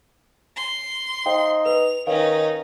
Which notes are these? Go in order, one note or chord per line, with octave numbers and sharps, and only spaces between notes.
C6
D#4 C5 F5 G5
B4 F7
D#3 C#4 D#4 B4 C#5 F5